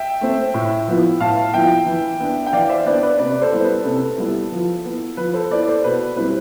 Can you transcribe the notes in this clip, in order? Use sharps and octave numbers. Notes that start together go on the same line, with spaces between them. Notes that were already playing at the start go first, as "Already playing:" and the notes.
Already playing: E5 G5
A3 C4
A2
F3 B3 E4
A2 F5 A5
F3 B3 E4 E5 G5
E3
B3 D4
G5
E3 D5 F5
C5 E5
B3 D4 B4 D5
B4
C3 B4 D5
A4 C5
G3 B3 E4
B4
C3 A4
G3 B3 E4
F3
B3 E4
F3 B4
A4 C5
B3 E4 B4 D5
A4 C5
B2 B4
G3 C4 E4 B4